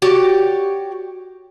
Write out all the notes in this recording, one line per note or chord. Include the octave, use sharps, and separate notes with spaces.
F#4 G4 C#5 D5